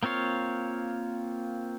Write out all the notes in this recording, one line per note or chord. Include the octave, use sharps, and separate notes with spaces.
A#3 C4 F4 C#5 F5